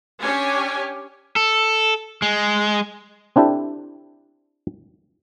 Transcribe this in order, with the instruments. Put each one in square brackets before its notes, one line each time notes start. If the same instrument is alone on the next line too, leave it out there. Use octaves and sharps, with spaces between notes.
[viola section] C#4 D4 G4 C#5 G#5
[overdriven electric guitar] A4
G#3
[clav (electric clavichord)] C4 D4 E4 G4 A4